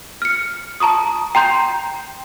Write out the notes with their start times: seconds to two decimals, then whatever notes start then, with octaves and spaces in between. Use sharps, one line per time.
0.22 F6 C#7
0.80 A5 A#5 C#6 D#6
1.35 G5 A#5 C6 G6